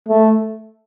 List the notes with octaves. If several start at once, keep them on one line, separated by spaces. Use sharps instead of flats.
A3